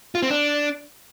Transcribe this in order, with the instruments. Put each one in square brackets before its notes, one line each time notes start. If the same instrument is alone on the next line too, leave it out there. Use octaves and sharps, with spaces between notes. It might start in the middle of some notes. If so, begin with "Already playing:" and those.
[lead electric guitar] F4
C4
D4